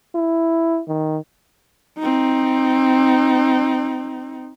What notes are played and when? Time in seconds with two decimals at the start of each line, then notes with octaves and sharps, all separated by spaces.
0.15 E4
0.88 D#3
1.98 C4 D#4